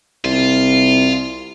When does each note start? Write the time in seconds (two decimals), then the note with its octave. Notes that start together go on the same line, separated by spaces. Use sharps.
0.24 C2 F4